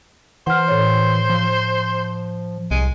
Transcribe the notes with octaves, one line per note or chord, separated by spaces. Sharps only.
E3 C5 F#5 F6
A2 C#5
F3
C2 G#3